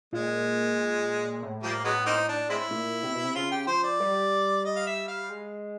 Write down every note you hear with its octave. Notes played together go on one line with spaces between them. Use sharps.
A#2 G#3
A2
F3 G3 A#3
F#3 G#3 B3
A#3 C4 D#4
D4
G#3 C4 E4
A#2
C3
B2
C3
C#3 F4
G4
F3 C5
D5
G3
D#5
F5
E5
F5
G#3